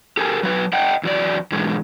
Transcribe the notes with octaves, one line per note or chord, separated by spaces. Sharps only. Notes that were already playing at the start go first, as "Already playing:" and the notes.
G4 A4 A#4 G#5
F#3 B4
D#5 F#5 G5
E2 F#3 D5
G#2 B2 D3 E3 G#3